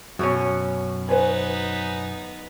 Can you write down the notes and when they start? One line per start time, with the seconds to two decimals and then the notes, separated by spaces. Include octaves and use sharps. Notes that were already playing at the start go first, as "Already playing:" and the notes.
0.19 F#2 B2 C#4 F#4 C#5
1.09 B3 D#4 B4 C5 G#5